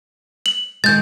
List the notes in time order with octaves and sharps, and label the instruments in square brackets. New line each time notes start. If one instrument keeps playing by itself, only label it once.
[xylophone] F#7
[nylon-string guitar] D#3 G#3 [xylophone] G6 A6